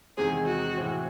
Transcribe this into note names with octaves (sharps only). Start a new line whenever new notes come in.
E2 C3 D#3 G#3 C4 G#4
F#4
A2 E3 C4 F#4